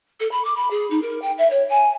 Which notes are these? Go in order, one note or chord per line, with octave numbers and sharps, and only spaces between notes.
A4
B5
D6
B5
G#4
D#4
A#4
G5
E5
C#5
G#5